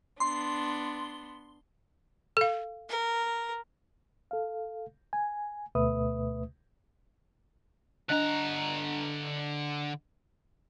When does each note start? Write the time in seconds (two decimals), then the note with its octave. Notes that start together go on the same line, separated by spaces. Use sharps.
0.20 B3 D4 C6
2.37 A4 F5
2.89 A#4
4.31 A4 F5
5.13 G#5
5.75 D2 B2 A3 B4 E5 D#6
8.09 D3 D4 D#5 A#5 F#6